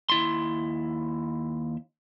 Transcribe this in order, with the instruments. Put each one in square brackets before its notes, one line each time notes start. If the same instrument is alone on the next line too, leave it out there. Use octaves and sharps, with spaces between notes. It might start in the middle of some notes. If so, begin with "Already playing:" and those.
[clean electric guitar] D#2 E4 C6